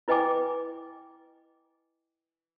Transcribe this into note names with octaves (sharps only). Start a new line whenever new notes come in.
E4 B4 D#5 G5 G#5 D6